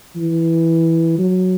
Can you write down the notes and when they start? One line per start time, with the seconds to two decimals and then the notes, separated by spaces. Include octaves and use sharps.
0.16 E3
1.18 F#3